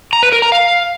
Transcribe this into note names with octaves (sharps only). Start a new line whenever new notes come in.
A#5
B4
A#4
A#5
F5